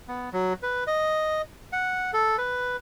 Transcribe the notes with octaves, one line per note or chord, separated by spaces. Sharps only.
B3
F#3
B4
D#5
F#5
A4
B4